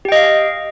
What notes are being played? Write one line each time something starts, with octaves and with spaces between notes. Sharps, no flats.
G4 D#5 F5 G5